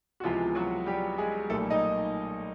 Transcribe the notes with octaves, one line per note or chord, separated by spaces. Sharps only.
F#4
C#2 C3 E3 F3 G#3 B3 F4
F#3 F#4
G3 G4
G#3 G#4
B1 A#2 G3 A3 A#3 A4
D#4 D#5